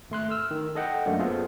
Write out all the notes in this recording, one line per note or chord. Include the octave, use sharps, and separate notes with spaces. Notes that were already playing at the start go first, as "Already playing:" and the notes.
G#1 A3 C6 F#6
E6 F6
D#3
A4 D#5 F#5 G5
F#2 F#3 A3 A#3 D4
B3 F4 G#4 A4 C5